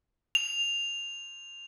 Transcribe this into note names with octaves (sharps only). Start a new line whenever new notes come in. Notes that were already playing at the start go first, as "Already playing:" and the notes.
F7